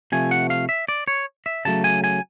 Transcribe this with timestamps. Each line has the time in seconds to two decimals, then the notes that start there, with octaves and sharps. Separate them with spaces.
0.12 C3 F3 A3 G#5
0.31 F#5
0.50 F5
0.69 E5
0.89 D5
1.08 C#5
1.46 E5
1.65 C#3 F#3 A3 A5
1.84 G#5
2.04 G#5